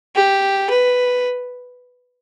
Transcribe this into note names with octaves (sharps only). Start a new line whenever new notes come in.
G4
B4